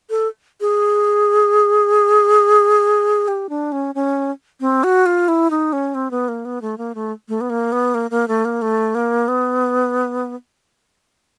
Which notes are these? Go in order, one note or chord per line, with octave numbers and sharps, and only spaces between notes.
A4
G#4
G4
D4
C#4
C#4
C4
F#4
F4
E4
D#4
C#4
C4
B3
A#3
B3
A3
A#3
A3
A3
B3
A#3
B3
A#3
A#3
A3
A#3
A3
A#3
B3